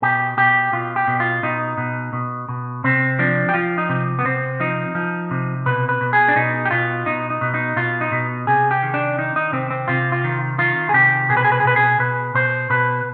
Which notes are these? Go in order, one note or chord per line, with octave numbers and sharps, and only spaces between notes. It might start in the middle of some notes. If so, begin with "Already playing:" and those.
B2 G4
B2 G4
B2 F4
G4
B2
F4
B2 D#4
B2
B2
B2
C3 C4
F3 D4
G4
F3 F4
D#4
C3
B3
C3 C4
F3 D#4
F3
C3
B2 B4
B4
B2
G#4
D4
B2 D#4
G4
B2 F4
B2 D#4
D#4
B2
D#4
B2 F4
D#4
B2
C3 G#4
G4
D#3
D4
D#3 D#4
D#4
C3 C4
C4
C3 F4
F4
D#3
D#3 F4
G#4
C3 G4
B2 G#4
B4
G#4
B4
G#4
B2 B4
G#4
B2 B4
B2 C5
B2 B4